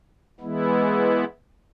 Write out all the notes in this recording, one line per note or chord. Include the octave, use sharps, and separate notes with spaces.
E3 G#3 B3 E4